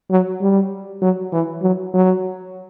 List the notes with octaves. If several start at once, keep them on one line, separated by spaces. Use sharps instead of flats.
F#3
G3
F#3
E3
F#3
F#3